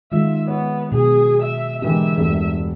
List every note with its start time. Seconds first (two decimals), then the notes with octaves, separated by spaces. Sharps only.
0.12 D#3 G#3 F4 E5
0.47 B3 C#5
0.92 B2 G#4
1.42 E5
1.82 D3 E3 G#3 G4 A#4 E5
2.17 E1 G2 A3